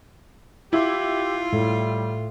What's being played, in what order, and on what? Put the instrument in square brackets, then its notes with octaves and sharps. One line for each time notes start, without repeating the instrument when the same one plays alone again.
[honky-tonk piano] E4 [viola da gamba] F4 [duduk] G4 [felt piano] E5 D6
[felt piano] A2 [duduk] G3